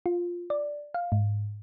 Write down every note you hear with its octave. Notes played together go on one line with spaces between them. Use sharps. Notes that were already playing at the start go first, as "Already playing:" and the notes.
F4
D5
F5
G#2